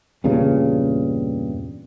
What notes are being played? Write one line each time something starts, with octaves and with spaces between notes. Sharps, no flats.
E2 G2 A#2 C#3